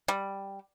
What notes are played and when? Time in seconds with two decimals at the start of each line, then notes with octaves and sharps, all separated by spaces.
0.08 G3